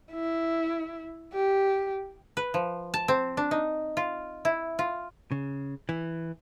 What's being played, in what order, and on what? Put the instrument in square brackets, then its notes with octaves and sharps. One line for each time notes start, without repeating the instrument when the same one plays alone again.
[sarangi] E4
G4
[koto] B4
F3
A5
C4
D4
D#4
F4
E4
F4
[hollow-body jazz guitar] C#3
E3